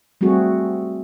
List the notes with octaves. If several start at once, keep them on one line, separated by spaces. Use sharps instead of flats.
G3 A3 C4 F#4 G#4